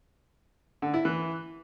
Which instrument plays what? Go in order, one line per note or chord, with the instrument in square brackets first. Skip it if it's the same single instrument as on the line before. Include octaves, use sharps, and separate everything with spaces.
[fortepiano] D3
E4
E3